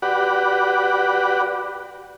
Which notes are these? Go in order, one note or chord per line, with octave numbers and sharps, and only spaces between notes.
F#4 G4 B4 D5 F#5